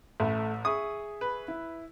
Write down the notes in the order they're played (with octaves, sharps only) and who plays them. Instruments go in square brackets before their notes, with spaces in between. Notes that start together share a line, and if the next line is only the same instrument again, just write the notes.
[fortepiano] A1 [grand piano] A3 E5
[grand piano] G#4 E5 C#6 [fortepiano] D#6
[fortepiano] B4
[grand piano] E4